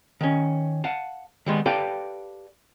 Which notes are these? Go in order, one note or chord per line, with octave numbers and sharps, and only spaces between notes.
D#3 C#4
F5 F#5 A5
D#3 G3 G#3 B3
G4 A4 B4 D5 F5 G5